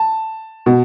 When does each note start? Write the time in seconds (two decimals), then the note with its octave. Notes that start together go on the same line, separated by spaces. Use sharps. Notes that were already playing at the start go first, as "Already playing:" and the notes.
Already playing: A5
0.66 B2